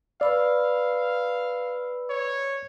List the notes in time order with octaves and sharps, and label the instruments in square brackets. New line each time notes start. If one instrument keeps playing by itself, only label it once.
[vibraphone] B4 B5 E6 [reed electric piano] D5 [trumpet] F5
[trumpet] C#5